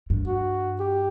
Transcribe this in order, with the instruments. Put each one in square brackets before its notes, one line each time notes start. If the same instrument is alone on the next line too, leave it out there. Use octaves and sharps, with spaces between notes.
[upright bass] G2
[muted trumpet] F#4
G4